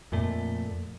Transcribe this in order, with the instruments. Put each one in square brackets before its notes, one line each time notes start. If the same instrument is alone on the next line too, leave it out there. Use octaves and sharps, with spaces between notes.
[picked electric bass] F2 A#2 A3